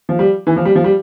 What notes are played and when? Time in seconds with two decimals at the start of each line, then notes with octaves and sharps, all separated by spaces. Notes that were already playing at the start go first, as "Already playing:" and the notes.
0.09 F3
0.19 G3
0.47 E3
0.56 F3
0.65 G3
0.75 F3
0.84 G3